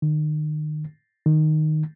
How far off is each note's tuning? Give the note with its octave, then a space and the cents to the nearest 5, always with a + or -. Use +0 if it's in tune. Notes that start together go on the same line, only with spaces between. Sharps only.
D#3 -35
D#3 -10